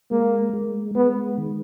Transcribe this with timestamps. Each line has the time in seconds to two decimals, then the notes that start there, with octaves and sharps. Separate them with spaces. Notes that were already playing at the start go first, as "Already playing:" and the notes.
0.11 G#3 A#3
0.53 G#3
0.95 G#3 B3
1.38 D#3